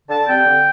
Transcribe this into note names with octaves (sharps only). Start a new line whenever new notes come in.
D3 A5
G3 C4 G5
D3